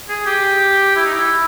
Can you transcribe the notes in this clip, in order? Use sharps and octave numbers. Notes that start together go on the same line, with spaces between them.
G#4
G4
E4
D#4
E4